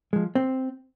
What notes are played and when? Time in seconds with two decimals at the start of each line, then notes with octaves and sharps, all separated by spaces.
0.13 F3 G#3
0.35 C4